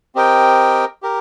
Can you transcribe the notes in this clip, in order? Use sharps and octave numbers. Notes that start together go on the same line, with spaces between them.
C4 G4 A#4 D#5 G5
G4 A#4